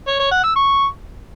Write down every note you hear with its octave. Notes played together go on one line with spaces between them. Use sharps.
C#5
C#5
F#5
E6
C#6